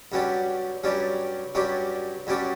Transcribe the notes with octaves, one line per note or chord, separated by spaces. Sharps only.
G2 F#3 C#4 G4 D5
G2 F#3 C#4 G4 D5
G2 F#3 C#4 G4 D5
G2 F#3 C#4 G4 D5